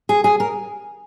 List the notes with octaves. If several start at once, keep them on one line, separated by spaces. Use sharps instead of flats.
G#4
G#4
A#4